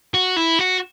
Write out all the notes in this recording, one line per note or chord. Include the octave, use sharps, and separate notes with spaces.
F#4
E4
F#4